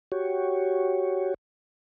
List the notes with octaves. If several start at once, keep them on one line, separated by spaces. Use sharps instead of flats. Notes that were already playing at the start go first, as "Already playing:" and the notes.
F#4 G4 C#5